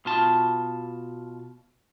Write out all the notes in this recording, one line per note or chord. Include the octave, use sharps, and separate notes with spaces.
B2 F4 A5